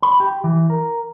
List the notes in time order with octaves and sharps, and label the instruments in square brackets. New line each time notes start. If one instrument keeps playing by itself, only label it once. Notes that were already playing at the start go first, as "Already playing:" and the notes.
[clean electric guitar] B5
G4
E3
A#4